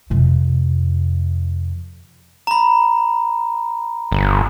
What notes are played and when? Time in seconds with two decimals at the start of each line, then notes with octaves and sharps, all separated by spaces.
0.10 F2 C3
2.47 A#5 B5
4.12 G1